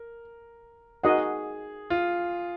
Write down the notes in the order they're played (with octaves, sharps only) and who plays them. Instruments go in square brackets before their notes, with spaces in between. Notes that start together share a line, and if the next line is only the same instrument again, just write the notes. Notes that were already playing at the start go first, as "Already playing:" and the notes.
Already playing: [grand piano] A#4
[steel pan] D#4 F#4 A#4 D#5 F#5 [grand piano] G#4
[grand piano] F4